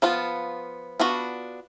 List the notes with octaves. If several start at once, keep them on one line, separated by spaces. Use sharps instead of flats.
F3 B3 F4
B3 D4 F4 F#4